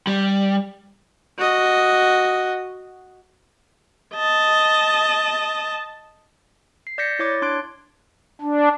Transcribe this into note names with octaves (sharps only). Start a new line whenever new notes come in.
G3
F#4 D#5
D#5 A5
C7
D5 G6 A#6 B6 C#7
E4 C#5 D6 A6
D4 C6 F#6 D7
D4